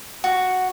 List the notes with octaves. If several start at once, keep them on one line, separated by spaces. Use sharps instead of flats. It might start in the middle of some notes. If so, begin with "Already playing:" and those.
F#4